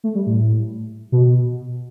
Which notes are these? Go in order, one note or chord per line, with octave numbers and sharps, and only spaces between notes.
A3
G3
A2
B2